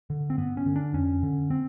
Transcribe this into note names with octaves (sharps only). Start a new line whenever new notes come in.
D3
C4
G2 B3
C#4
D3
D4
F2 C#4
D3
C4